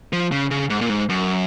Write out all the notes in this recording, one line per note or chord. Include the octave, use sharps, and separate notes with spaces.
F3
C#3
C#3
G#2
A#2
G#2
F#2